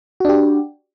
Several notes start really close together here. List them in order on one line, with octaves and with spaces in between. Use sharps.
F#4 D4 G4